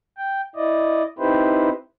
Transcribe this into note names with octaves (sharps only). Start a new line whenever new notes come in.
G5
E4 D5 D#5
C4 D#4 E4 G4 B4 C5